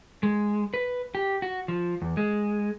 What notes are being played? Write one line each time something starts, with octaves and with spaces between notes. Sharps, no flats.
G#3
B4
G4
F#4
F3
E2
G#3